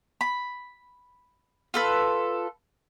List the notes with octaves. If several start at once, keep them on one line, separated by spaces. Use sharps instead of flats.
B5
F4 A4 B4